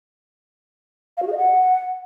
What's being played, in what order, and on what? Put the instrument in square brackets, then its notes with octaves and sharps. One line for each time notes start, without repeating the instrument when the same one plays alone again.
[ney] F5
F#4
G#4
D#5
F#5